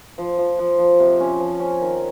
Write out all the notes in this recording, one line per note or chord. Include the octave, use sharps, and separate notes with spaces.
F3
F3
F3
F3
C3
C#4
F3
C#4
D#3